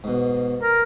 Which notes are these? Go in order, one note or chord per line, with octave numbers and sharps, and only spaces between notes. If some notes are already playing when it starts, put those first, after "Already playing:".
G#2 B2
A#4